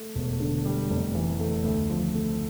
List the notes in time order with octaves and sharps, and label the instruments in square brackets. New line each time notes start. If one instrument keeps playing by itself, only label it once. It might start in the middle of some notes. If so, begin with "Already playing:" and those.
Already playing: [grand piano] A3
E1
D3
G3
F1
E3
A3
D2
F3
A3